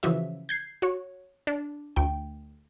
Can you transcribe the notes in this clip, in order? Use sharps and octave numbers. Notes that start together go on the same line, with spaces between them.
C#3 E3 F3 F#4 E5
G6 G#6 C7
F#4 C#5
D4
D2 G5